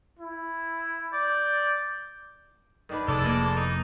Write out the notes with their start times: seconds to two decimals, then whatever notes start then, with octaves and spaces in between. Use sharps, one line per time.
0.19 E4
1.13 D5 G6
2.89 D#3 D4 B4
3.08 F1 G#3 A4 D5
3.22 E3 A#3 A#4
3.56 D#4